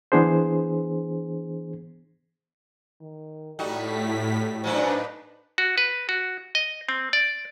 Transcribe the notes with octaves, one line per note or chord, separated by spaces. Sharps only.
E3 B3 D4 G#4 C5
D#3
A2 G3 D#4 F#4 A4 B6
A#2 F#3 A3 D4 D#4 B4 C5
F#4
B4
F#4
D#5
C4
D5